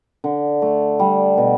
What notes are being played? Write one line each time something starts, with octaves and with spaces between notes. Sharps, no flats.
D3
A3
G3
B2